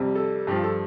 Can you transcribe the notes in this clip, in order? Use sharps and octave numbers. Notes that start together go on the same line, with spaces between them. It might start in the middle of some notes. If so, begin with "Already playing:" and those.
Already playing: F2 C3 G3
A4
G2 F3 F4 G4
A4